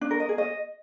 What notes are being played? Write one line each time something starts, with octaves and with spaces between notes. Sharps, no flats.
D4
A#4
D#5
G#4
D#5